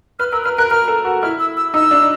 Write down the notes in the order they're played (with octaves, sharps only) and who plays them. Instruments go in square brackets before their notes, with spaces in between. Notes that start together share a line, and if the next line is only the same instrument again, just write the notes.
[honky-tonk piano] B4 [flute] F6
[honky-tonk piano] A#4 [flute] E6
[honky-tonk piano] B4 [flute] F6
[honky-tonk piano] A#4 [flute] F#6
[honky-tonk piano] A#4 [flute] F6
[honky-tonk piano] A4
F#4
[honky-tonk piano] E4 [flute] F6
[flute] E6
E6
[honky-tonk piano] D#4 [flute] E6
[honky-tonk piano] D4